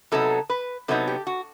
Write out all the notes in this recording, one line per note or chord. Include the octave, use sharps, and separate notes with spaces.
C3 F#3 B3 D#4 A4
B4
C3 F#3 B3 D#4 A4
G4
F#4